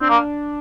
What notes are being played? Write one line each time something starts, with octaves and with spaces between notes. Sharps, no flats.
C4 D4
A#3